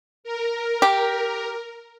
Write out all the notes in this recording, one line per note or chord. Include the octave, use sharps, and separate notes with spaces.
A#4
G4